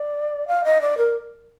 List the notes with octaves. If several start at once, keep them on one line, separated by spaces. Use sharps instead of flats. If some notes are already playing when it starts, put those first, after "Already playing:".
Already playing: D5
F5
D#5
D5
A#4